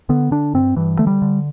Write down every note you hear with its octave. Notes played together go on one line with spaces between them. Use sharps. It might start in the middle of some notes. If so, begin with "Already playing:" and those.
D3 B3
D3 D4
G2 C4
G2 E3
D3 A3
G3
D3